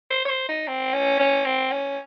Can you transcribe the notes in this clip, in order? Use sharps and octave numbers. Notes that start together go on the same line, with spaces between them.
C5
C#5
C5
D#4
C4
C#4
C#4
C4
C#4